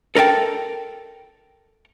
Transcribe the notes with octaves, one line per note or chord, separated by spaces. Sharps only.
A4 A#4 D5 G5 A5